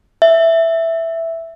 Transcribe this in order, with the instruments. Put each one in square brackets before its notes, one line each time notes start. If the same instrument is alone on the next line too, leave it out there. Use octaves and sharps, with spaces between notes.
[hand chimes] E5